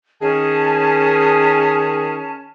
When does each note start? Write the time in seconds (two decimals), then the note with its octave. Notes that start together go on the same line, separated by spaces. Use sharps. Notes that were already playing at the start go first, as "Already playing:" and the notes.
0.21 D#3 C#4 G#4 A5